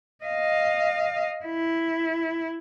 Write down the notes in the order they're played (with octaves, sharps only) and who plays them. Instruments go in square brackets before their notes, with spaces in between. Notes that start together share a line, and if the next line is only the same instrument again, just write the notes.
[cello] D#5 F5
E4